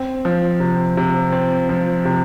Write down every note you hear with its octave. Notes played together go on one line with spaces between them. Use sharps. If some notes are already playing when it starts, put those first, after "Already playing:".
Already playing: C4
F3
C3
C3
C4
F3
C3